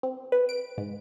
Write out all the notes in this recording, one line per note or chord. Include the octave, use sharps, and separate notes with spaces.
C4
B4
D7
G#2